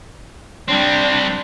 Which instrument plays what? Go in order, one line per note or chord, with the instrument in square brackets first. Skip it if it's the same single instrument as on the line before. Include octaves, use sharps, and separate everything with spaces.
[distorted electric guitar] G3 C4 [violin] D4